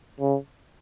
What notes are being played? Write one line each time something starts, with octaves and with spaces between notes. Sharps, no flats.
C#3